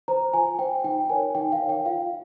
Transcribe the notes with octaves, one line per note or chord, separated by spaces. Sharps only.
C5 A#5
F4 G#5
C5 G5
D#4 G5
A#4 C#5 G#5
D#4 G5
F5
A#4 C#5
G5
F4 F5